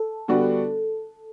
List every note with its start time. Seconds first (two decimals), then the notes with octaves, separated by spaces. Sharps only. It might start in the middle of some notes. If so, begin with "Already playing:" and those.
Already playing: A4
0.28 D3 G3 B3 D4 F#4